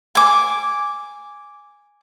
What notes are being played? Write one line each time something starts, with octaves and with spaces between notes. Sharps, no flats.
G#5 D6